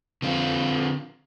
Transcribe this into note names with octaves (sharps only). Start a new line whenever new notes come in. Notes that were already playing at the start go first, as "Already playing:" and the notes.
D3 C4 F4